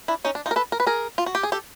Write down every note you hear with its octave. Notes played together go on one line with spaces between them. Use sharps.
D4 E4
C#4 D#4
D4
D#4 F4
A#4
A4 B4
A#4
B4
G#4 A#4
F4
F#4
G4
G#4
G4 A4